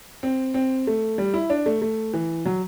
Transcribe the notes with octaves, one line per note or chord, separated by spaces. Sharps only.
C4
C4
A3
G3
E4
D4
A3
A3
E3
F#3